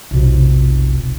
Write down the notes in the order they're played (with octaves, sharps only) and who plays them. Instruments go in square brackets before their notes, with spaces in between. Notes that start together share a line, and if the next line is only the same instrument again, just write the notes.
[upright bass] F1 B1